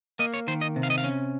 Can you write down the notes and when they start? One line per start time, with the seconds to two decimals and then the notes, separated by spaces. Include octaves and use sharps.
0.19 A#3 D#5
0.34 C#5
0.47 D#3 C5
0.61 D#5
0.76 C3
0.83 F5
0.90 D#5
0.98 F5
1.04 C#4